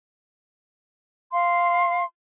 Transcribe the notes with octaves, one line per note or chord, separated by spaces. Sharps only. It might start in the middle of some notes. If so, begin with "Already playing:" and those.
F5 C6